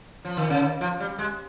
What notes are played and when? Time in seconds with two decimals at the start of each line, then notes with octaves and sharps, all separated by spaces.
0.25 F3
0.37 D#3
0.50 C#3
0.62 D#3
0.81 F3
1.00 G3
1.18 G#3